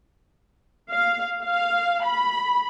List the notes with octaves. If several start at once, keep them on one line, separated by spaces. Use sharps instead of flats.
F5
F5
B5